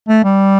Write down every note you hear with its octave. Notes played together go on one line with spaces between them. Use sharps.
A3
G3